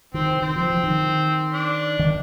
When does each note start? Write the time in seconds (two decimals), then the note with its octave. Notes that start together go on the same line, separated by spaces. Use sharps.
0.14 D#3 C4 C5
0.42 D#3 C4 C5
0.56 F3
0.70 F3
0.84 D#3
1.53 D4 D5
1.99 D#3